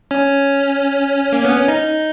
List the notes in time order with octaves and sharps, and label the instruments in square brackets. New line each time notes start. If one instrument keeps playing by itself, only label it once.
[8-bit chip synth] C#4
A#3
B3
C#4
D#4